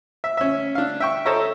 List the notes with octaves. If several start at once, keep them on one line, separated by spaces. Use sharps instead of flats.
E5
C#4 E5
D4 F5
E5 G5 C#6
A4 C5 C#5 D#5 E5 A#5